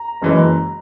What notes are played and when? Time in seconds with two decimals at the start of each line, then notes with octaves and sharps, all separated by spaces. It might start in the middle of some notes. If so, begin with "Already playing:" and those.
Already playing: A#5
0.22 F#1 F#2 E3 G#3